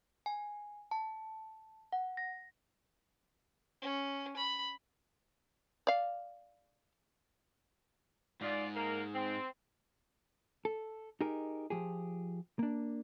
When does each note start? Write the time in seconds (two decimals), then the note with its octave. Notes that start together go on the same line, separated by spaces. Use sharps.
0.26 G#5
0.91 A5
1.92 F#5
2.17 A#6
3.81 C#4
4.36 B5
5.87 D5 F5
8.41 G#2 F4 D5
8.75 A#3 A#4
9.14 C4
10.65 A4
11.21 D#4 G4 G#4 A#4
11.70 F3 G4 G#4
12.59 A#3 D4